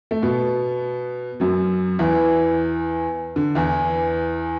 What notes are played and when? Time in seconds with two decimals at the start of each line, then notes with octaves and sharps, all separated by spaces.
0.11 A3
0.22 B2 B3
1.40 F#2 F#3
1.99 E2 E3
3.36 D3
3.55 E2 E3